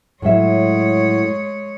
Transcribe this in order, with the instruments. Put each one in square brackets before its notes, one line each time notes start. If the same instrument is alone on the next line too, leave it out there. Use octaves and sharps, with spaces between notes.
[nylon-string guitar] A2 F#3 E5 [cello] G#3 C#5